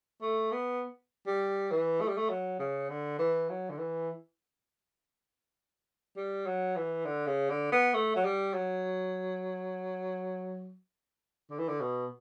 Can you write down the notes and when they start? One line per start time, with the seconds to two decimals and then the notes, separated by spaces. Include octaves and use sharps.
0.22 A3
0.52 B3
1.27 G3
1.71 E3
2.01 A3
2.08 G3
2.17 A3
2.29 F#3
2.59 C#3
2.90 D3
3.19 E3
3.49 F#3
3.70 D3
3.79 E3
6.17 G3
6.46 F#3
6.76 E3
7.05 D3
7.27 C#3
7.50 D3
7.72 B3
7.94 A3
8.16 F#3
8.24 G3
8.54 F#3
11.50 D3
11.59 E3
11.69 D3
11.81 B2